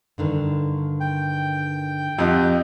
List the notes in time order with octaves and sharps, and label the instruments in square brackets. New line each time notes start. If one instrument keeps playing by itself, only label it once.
[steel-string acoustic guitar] G2 D3 D#3
[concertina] G5
[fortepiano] F2 [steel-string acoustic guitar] G4 D#5 F#5